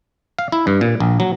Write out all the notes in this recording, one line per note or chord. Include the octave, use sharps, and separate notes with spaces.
F5
E4
G2
A#2
A#1
F#3